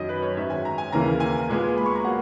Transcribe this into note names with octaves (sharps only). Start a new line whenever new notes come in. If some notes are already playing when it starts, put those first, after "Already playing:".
Already playing: F#2 D#3 F#3 D#5
B4
C#5
G#2 D#3 F#3 C#4 E5
G#5
A#5
G#5
D#2 C#3 E3 A#3 A#5
G#5
A#2 G#3 B3
B5
C#6
A#5
F#3 A#3 F#5